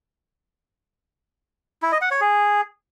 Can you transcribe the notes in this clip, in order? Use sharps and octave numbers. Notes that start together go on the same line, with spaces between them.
E4
D#5
F#5
C#5
G#4